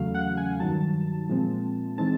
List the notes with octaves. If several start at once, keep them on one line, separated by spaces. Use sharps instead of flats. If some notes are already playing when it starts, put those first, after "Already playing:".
Already playing: E2 C#3 F#3 A3 F5
F#5
G#5
G2 D#3 F#3 A5
A#2 F3 G#3 C4
E3 G#3 C4 D#4 A5